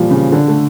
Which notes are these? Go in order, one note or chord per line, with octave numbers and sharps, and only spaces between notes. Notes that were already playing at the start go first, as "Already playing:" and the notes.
Already playing: A#2 E3 F3 G3
C#3
D3
A3